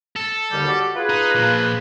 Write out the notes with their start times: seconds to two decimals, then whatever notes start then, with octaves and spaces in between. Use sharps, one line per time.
0.16 A4
0.51 D#2 D3 G3
0.67 F#4 G4 D5
0.95 F4 G#4 B4
1.10 D#4
1.35 A#2 F3